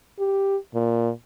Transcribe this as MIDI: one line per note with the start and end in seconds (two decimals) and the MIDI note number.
0.19 0.57 67
0.74 1.11 46